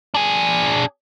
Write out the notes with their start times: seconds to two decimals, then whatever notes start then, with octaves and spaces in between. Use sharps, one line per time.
0.14 D4 G#4